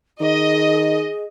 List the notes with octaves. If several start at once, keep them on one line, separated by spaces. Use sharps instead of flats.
D#3 G#4 D#5